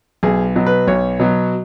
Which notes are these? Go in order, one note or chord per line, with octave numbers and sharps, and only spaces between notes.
B1 G#4
B2 F#3
B4
B1 C#5
B2 F#3